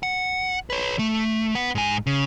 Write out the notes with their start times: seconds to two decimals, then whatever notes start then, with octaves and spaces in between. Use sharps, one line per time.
0.03 F#5
0.70 B4 C#5
0.99 A3
1.55 B3 F#5
1.75 G#2 G#5
2.07 C#3